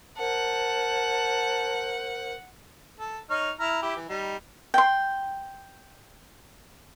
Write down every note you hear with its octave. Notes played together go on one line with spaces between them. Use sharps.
A#4 C5 F#5 A5
A4
D#4 C#5 F6
E4 A#5 F6
E4 G4
E3
G3 D#4
G5 C6